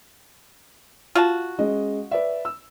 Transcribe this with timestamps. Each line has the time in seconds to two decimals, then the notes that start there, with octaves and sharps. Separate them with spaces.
1.15 F4 F#4 A5
1.59 G#3 C#4 D#5
2.11 B4 D5 E5
2.45 E6